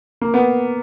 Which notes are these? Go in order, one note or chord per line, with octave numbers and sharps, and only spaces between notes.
A#3
B3